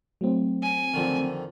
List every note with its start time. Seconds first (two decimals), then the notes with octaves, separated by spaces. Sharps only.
0.21 F#3 A3 C4
0.63 G#5
0.94 F2 D3 D#3